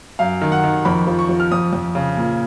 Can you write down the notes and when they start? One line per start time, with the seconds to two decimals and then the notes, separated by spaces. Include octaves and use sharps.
0.19 F#2 F5
0.41 D#3
0.52 F#5
0.64 D#3
0.85 F2 B5
1.07 F3
1.19 C#6
1.29 F3
1.40 F6
1.51 F2 D#6
1.73 F2
1.95 C#3
2.17 A#2